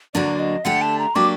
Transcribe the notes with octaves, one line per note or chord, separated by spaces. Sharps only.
D2 D3 F#3 A#3 D4 D5
D#5
D3 A3 D4 G4 F#5
A5
A#5
F#3 A#3 D4 G4 D6